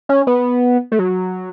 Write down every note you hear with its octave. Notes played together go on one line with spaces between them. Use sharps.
C#4
B3
A3
F#3